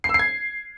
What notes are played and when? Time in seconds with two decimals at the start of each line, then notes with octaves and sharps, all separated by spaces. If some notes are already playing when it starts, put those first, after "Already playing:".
0.04 C7
0.09 E6
0.14 C7
0.19 G#6